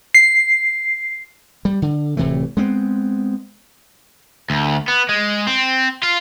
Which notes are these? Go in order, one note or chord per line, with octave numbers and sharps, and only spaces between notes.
C7
G3
D3
D1 C3 E3 A3
G#3 B3 C4
D2
B3
G#3
C4
F4